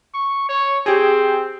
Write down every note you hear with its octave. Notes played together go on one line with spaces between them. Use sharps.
C#6
C#5
C4 G4 G#4